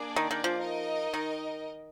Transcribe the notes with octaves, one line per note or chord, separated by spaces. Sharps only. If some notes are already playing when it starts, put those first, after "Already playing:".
Already playing: A#3 D4 G#4 D5
D#3
D#3
F3
D#4 A#4 D#5
D#3